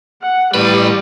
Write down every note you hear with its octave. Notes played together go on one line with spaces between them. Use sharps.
F#5
A2 G3 B4